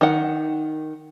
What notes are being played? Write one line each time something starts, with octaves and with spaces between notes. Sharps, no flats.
D#3 F#5